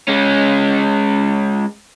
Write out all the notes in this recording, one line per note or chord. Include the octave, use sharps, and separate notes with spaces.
G#3 C#4